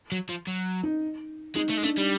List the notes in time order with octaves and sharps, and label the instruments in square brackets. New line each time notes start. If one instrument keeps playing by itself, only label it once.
[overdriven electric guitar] F#3
F3
F#3
[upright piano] D#4
[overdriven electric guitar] G#3 [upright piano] D#4
[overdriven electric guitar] A3
G#3
[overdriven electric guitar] A3 [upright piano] D4
[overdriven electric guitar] G3